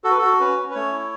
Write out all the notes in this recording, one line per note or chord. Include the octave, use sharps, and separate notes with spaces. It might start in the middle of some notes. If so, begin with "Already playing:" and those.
F#4 A4
B4
F#4 A4
C#4 B4
C#4
B4
A3 C#5
E4